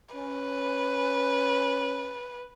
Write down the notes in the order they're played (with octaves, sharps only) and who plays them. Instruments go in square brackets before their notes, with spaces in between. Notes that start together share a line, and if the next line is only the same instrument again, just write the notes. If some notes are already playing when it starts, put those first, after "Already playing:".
[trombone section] C#4 [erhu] B4